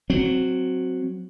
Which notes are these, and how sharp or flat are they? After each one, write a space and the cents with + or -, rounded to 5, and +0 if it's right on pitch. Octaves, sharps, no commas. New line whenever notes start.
F#3 -5 C4 +0